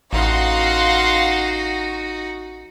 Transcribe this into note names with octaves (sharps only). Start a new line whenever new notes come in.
A1 D#4 F#4 F5 F#5 C6